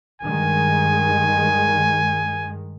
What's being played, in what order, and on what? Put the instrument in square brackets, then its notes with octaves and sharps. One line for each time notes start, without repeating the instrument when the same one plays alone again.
[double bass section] G2 D#3 G#3 [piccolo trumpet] G#5